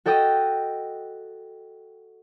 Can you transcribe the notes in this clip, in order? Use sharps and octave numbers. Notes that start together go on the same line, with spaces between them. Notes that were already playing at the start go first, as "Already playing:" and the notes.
F#4 A4 D#5 G5 D#6